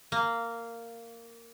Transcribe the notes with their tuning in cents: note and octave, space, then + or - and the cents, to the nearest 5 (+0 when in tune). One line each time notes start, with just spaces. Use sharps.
A#3 -10